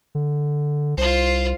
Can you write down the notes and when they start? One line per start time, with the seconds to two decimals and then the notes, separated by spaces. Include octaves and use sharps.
0.15 D3
0.97 C2 F4 C5